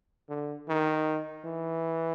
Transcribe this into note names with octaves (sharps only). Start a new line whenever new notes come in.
D3
D#3
E3